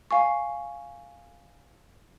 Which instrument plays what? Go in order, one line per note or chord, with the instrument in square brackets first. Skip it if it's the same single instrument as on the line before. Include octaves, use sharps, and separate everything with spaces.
[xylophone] F5 G#5 C#6